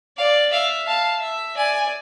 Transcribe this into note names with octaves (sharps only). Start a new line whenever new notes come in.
D5 F5
E5 F5
F5 A5
E5
D5 G#5